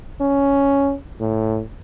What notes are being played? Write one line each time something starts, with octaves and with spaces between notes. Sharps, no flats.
C#4
A2